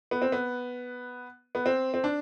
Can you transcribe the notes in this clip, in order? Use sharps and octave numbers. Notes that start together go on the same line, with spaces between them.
B3
C4
B3
B3
C4
C4
D4